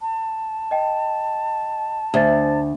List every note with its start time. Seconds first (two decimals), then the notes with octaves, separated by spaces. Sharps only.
0.01 A5
0.71 D#5 G5
2.14 D2 C5 A6